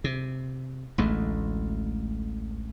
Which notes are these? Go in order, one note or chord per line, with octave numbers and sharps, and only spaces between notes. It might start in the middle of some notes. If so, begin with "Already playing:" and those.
C3
A1 D2 G#3 A3